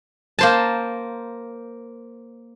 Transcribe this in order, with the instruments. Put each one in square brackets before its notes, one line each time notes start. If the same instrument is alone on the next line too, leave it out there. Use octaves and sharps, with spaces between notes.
[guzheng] A#3 C5 A5